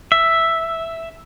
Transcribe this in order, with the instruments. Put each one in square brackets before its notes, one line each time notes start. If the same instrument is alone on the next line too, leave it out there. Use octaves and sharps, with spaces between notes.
[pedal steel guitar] E5